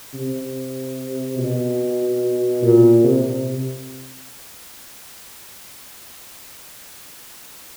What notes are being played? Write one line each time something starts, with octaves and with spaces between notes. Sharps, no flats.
C3
B2
A#2
C3